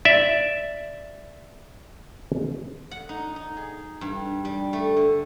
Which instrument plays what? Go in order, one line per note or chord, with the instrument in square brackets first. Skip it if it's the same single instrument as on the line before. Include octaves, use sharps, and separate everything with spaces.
[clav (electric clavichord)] D5 E5
[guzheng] F#5
D#4
D#4
G#4
G2
G3
A3
D3